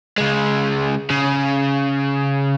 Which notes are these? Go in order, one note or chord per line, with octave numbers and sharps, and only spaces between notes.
C#3 G#3
C#3